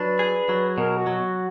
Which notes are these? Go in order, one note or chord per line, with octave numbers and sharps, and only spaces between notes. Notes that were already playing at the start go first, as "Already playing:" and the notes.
Already playing: F#3 D4 B4
G#4
F#3
B2 A#4
F#4
F#3
F#4